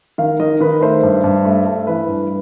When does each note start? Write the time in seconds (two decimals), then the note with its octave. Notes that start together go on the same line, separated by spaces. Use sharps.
0.18 D#3 F5
0.40 D#3 D#5
0.61 D#3 B4
0.81 A3 C5
1.03 G2
1.24 G2
1.45 A3
1.66 A3
1.87 E3 B4
2.08 G2